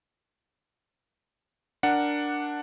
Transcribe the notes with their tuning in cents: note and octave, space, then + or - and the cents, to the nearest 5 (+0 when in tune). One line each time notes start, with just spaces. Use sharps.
D4 +0 A#4 +0 F#5 +0